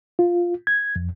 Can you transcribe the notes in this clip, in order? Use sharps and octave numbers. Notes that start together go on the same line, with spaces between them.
F4
G#6
F2